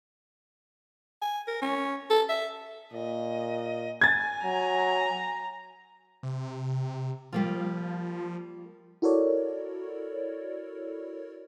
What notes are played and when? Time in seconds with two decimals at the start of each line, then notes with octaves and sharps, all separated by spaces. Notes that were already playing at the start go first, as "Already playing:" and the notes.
1.22 G#5
1.48 A#4
1.62 C#4
2.10 A4
2.29 E5
2.93 A#2 D#5
4.01 G#5 G#6 A6
4.44 F#3 A#5
6.23 C3
7.33 F3 G3 A#3 F4
9.02 E4 F#4 A4 A#4 C#5 D5